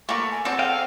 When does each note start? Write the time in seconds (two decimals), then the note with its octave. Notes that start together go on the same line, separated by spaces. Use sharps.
0.09 A3 A#3 A#4 B4 C#6 D6
0.30 G#5
0.45 C4 G#4 A4 D5 F#5
0.59 G#4 F5 G5